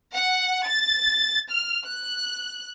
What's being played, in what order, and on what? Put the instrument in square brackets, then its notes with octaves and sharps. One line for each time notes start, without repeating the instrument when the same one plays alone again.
[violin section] F#5
A6
F6
F#6